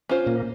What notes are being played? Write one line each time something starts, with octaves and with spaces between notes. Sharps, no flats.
C#4 F4 C5
A#2 A#3